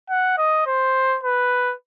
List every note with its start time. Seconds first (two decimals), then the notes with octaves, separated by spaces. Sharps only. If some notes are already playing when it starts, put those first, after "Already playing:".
0.10 F#5
0.38 D#5
0.67 C5
1.23 B4